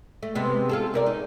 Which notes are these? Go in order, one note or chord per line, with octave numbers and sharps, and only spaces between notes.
A3
C3 G#3 B3
F4 G#4 A4
C3 A#4 D5
D#4